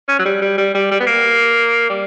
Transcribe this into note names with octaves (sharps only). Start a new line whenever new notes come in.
C#4
F#3
G3
G3
G3
G3
G3
B3
A#3
G3